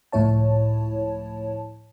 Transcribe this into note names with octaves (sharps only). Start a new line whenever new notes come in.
C#2 A2 F3 E4 C#5 A5